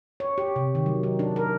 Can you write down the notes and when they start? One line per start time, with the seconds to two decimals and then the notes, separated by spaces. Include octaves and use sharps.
0.20 C#5
0.38 G4
0.56 C3
0.75 D#3
0.86 F#3
1.03 D#4
1.19 D4
1.36 A#4